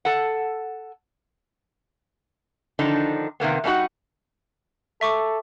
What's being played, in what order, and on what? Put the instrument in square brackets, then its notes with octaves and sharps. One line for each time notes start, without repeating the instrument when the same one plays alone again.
[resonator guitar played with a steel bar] A4 F#5
D3 D#3 F3 D4 D#4
C3 D#3 A#3 B3
G3 A#3 D4 D#4 F#4 F#5
[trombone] A4 [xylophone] E5 C#6 D6